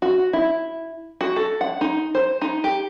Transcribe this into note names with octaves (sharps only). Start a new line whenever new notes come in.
F#4
E4
F#4
A4
F#5
D#4
C5
D#4
G4